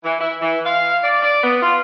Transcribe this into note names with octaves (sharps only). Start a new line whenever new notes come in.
E3
E4
E3
F5
D5
D5
B3
F4